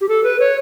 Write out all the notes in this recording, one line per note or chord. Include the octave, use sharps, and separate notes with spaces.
G4
A4
B4
C#5